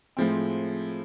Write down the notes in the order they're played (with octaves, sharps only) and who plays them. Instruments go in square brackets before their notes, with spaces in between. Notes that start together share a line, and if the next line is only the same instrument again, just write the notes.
[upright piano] A2 F3 G#3 C4